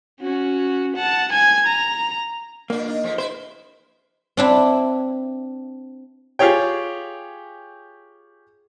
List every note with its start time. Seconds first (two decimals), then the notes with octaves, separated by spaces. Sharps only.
0.20 C#4 F#4
0.96 F#5 A5
1.31 G#5 G#6
1.66 A#5
2.70 A#2 A#3 D4
2.87 D4 D#4
3.03 F2 F3 G#3
3.18 E4 B4 C5
4.37 C4 D4 E4
6.39 F4 G4 G#4 C#5 G5